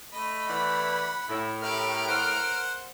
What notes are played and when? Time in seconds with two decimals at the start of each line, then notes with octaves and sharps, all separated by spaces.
0.13 A3 D#5 B5
0.48 E3 D5 F#5
1.29 A2 E4
1.62 E4 G4 A#4 F6 D7
2.08 C5 F#5